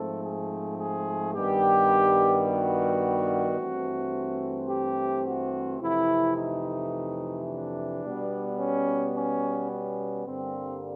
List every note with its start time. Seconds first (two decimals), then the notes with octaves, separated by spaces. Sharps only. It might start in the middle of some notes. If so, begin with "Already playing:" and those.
Already playing: G#2 F3 A3 C4 A4
0.23 G#4
0.79 G#4
1.35 G2 D#3 G3 B3 G4
2.46 F#4
3.58 G2 E3 A3 C4
4.69 G4
5.25 F#4
5.80 F2 C3 E3 A3 E4
6.36 D#4
7.47 D4
8.03 B2 G3 B3
8.58 C#4
9.15 C#4
9.70 C#4
10.26 G2 D3 G3 A#3 C4